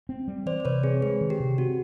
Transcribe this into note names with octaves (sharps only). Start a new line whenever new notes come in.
C4
G3
E3 C5 D5
D5
C3 B4 C#5
C4 G#4
G#3 G#4
D#3
G4
C3
C4 F#4